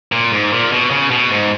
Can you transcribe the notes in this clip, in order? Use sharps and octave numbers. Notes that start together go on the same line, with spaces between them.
A#2
G#2
A#2
B2
C#3
B2
G#2